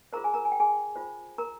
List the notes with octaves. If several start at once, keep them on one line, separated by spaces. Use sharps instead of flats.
F4 G#4 A#4 C5 A#5
G#4 G#5
A#4 A#5
G#5
G5
G#4 G#5
F4 C5
A#4 A#5